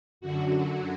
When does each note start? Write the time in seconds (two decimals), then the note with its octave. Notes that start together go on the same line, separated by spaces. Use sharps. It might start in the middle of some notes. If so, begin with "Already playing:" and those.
0.21 F#2 D3 F#3 F#4